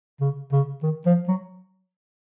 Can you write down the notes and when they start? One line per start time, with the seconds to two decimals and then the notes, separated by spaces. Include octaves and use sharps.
0.20 C#3
0.52 C#3
0.83 D#3
1.06 F3
1.28 F#3